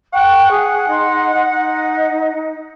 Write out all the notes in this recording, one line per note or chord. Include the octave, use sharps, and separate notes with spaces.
F#5 G5 C#6 F#6
G#4
D#4 C6
D#4